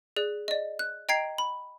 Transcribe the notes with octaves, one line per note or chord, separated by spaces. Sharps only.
G#4 D5 F#6
D5 D#5
F#6
D#5 G5 A#5 G#6 C7 D7
B5